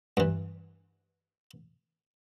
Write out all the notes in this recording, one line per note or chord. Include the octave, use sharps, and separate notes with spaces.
G2 E3